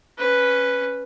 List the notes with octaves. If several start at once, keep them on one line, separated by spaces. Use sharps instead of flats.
C#4 B4